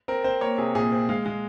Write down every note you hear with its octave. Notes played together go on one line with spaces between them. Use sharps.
C4 A#4
C4 C5
A#3 C#5
C3 G#4
A#2 G#4
C4
G#3 F5
G#3